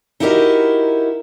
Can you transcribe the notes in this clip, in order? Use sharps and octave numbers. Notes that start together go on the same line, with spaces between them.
D#4 E4 F#4 G4 A#4 D#5